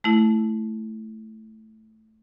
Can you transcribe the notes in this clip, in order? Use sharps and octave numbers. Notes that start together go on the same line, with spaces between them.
A3 E4